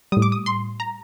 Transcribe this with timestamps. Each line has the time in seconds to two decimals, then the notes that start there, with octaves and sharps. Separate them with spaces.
0.12 A2 G3 D#6
0.22 D6
0.32 D#6
0.46 C6
0.80 A#5